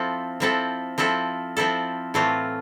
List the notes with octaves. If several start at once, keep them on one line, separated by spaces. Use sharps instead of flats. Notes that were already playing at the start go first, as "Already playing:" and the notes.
Already playing: F3 C4 E4 A4
F3 C4 E4 A4
F3 C4 E4 A4
F3 C4 E4 A4
A2 E3 A3 C4 F4